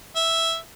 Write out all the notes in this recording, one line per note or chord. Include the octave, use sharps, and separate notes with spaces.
E5